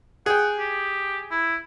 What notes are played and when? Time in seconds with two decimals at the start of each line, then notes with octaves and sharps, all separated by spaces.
0.26 G#4 F#5 G5
0.58 G4
1.31 E4